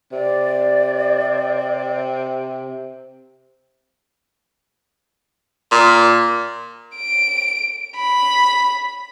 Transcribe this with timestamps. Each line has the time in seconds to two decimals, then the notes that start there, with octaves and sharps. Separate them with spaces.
0.12 C3 D5
5.72 A#2
6.96 D7
7.96 B5